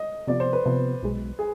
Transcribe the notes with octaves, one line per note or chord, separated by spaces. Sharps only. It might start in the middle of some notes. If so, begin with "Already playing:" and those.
Already playing: D#5
C3 F3 B3 D5
C5
B4
C3 F3 B3
B1 B2 G#3
G#4